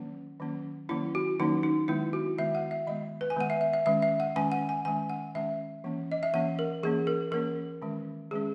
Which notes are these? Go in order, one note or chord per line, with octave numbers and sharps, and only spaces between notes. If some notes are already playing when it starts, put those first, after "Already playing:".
Already playing: D#3 F#3 A#3 C#4
D#3 F#3 A#3 C#4
D#3 F#3 A#3 C#4 E4
F#4
D#3 F#3 A#3 C#4 D#4
D#4
D#3 G#3 B3 E4
F#4
D#3 G#3 B3 E5
F#5
E5
D#3 G#3 B3 D#5
B4
G#5
D#3 G#3 B3 F#5
E5
E5
E5
D#3 G#3 C#4 E5
E5
F#5
D#3 G#3 C#4 G#5
F#5
G#5
D#3 G#3 C#4 G#5
F#5
D#3 G#3 C#4 E5
E3 A#3 C#4
D#5
E5
E3 A#3 C#4 F#5
A#4
E3 A#3 C#4 G#4
A#4
E3 A#3 C#4 A#4
D#3 G#3 C#4
D#3 G#3 C#4 G#4